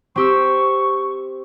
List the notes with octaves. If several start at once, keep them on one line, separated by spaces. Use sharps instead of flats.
C4 G4 C#6 E6